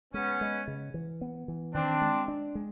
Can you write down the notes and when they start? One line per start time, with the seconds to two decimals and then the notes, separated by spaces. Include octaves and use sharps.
0.14 G#3 B3 C#4
0.41 G#3
0.68 C#3
0.94 E3
1.21 B3
1.48 E3
1.74 D#3 C4 D4
2.02 G#3
2.28 D4
2.55 G#3